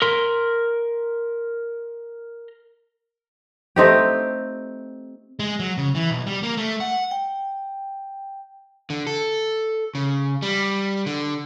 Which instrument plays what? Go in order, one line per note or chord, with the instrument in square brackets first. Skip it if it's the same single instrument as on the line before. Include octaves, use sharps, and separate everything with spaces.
[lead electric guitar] A#4 C6
[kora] A3 C4 D#4 G4
[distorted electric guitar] G#3
F#3
C#3
E3
B1
G3
A#3
A3
F#5
[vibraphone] G5
[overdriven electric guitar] D3
A4
C#3
G3
D3